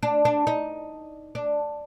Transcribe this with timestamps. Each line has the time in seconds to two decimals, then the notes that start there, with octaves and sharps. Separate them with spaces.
0.03 D4
0.25 D4
0.47 D#4
1.35 D4